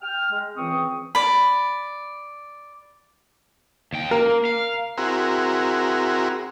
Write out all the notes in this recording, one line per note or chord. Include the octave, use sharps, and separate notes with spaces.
G5 F6
G#3
C#2 E3 C4 C#6 D#6
D5 B5
D#2 G5
A#3 A#4
F5
C4 E4 F#4 G#4 A#4